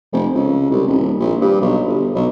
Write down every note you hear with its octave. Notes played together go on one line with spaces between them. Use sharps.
F1
C#2
C2
D#1
A#1
G2
B1
G1
B1